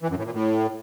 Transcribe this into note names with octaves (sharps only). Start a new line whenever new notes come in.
E3
F#2
A2
A#2
A2